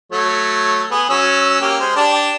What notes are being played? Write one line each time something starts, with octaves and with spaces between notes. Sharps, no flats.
F#3 A3 C#5
B3 G#4
F#3 C#4 E6
A#3 C#4 G4
G#3 C5
D4 G4 A5